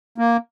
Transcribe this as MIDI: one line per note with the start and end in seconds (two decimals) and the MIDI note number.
0.18 0.37 58